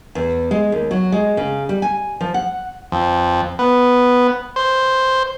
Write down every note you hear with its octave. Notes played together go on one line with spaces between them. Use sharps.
E2
G#3
D#2
F#3
G#3
C#3
G3
G#5
F3
F#5
F2
B3
C5